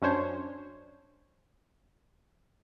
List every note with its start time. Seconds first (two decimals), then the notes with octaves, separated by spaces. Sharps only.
0.02 F#2 C#4 D4 C5 C#5